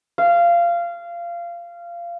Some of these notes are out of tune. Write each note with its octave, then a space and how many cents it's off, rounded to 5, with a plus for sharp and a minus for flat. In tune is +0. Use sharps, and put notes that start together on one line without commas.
F5 -20